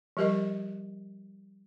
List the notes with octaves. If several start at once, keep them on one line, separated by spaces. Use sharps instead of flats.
F3 G3 G4 A#4 D#5